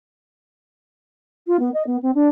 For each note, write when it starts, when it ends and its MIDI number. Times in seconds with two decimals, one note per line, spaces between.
1.47 1.56 65
1.59 1.69 59
1.73 1.82 75
1.86 1.96 59
2.02 2.10 60
2.14 2.28 62